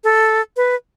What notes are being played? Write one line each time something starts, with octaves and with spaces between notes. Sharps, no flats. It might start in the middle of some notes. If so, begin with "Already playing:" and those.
A4
B4